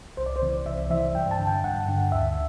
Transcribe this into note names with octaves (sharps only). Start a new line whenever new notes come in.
C2 C5
D5
C5
C3 E3
C2 E5
C3 E3 E5
G2 G5
A5
D3
G5
G2 F#5
D3
D2 E5